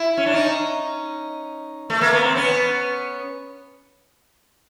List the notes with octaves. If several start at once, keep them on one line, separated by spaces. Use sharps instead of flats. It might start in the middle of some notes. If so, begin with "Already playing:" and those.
Already playing: E4
C#4
D4
C#4 D#4
A3
A#3
B3
C4
B3 C#4